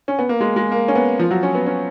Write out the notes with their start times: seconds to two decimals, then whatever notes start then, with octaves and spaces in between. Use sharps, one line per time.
0.08 C#4
0.19 B3
0.29 A#3
0.40 G#3
0.56 G#3
0.72 A#3
0.88 C#4
0.96 B3
1.19 F3
1.31 F#3
1.43 C#4
1.55 B3
1.67 C#4